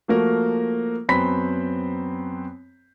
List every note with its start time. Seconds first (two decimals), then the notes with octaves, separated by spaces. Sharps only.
0.08 F3 A3 A#3 F#4 A#4
1.09 F#2 B3 C4 C5 B5 B6